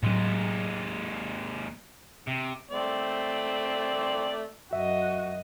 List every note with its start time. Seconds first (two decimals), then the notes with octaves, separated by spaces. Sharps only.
0.03 D#2 A2 F#3 G#3
2.27 C3
2.71 A3 C4 D5
4.73 F#2 F#4 D#5 E5